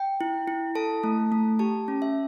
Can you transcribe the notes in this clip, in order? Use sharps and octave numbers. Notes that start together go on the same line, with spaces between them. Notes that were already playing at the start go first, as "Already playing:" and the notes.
Already playing: G5
E4
E4
A4 A5
A3
A3
G4 A5
C#4
E5